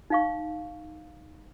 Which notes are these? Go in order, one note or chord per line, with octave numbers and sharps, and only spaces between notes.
D#4 F5 C#6